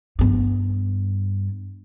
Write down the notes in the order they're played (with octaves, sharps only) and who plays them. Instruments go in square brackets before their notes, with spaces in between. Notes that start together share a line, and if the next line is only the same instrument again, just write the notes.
[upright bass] G2 B3